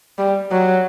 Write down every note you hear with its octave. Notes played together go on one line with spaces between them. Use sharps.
G3
F#3